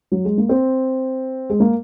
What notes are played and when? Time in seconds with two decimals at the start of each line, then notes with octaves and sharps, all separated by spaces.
0.12 F#3
0.25 G#3
0.38 A#3
0.49 C4
1.50 G#3
1.60 A#3